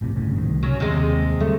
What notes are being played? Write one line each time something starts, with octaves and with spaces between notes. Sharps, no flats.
A#1 A2 C3
G1 A2 C#3
C2 A2 D#3
C#3 F#3 C#4
D#2 C3 G#3
D3 F#3 G3 A3